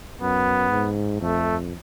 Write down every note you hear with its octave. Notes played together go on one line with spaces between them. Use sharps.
F#2 B3
G#2
F2 A3